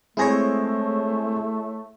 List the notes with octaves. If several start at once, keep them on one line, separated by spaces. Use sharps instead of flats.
G#3 A3 C4 E4 G#4 C#5 A#6